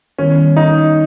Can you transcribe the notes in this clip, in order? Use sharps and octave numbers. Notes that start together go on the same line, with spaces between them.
D#3 G3 B3 C#4 E4
D#4